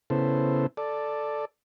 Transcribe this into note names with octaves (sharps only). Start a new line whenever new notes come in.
C#3 B3 E4 A4 C5
A4 D5